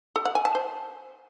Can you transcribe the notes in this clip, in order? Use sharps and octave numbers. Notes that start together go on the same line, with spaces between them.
A4
F#5
G#5
A5
C5